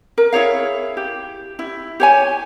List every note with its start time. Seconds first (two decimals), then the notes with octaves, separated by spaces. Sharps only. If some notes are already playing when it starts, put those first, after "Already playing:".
0.18 A#4
0.32 E4 G#4 C#5 F5
0.97 G4
1.59 E4
2.00 G4 C#5 G#5